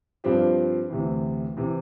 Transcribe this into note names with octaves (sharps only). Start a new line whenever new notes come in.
G2 F3 C4 G4
D2 C3 E3
C3 E3